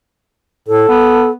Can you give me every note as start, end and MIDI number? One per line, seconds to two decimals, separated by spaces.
0.68 0.87 45
0.68 1.30 69
0.88 1.34 59